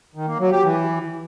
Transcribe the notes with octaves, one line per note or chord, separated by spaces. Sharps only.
D#3
A#3
F#3
G4
E3